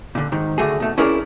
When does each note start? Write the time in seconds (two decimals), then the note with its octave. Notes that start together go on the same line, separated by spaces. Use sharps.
0.15 A#2 D3
0.32 G#2 D#3
0.58 D3 A3 F#4 G#4
0.80 B2 A3
0.98 C#4 E4 G#4 A#4 C#5 D5